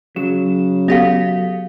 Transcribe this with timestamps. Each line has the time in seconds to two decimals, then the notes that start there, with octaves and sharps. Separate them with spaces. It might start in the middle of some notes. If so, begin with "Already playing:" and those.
0.16 C#3 F#3 E7
0.88 B3 G4 A4 E5 F5